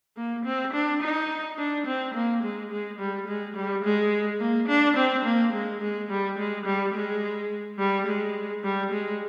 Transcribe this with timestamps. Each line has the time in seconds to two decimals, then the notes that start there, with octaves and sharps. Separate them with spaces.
0.17 A#3
0.45 C4
0.73 D4
1.02 D#4
1.58 D4
1.86 C4
2.14 A#3
2.43 G#3
2.71 G#3
2.98 G3
3.27 G#3
3.56 G3
3.84 G#3
4.40 A#3
4.68 D4
4.96 C4
5.24 A#3
5.53 G#3
5.81 G#3
6.09 G3
6.38 G#3
6.66 G3
6.94 G#3
7.79 G3
8.07 G#3
8.64 G3
8.91 G#3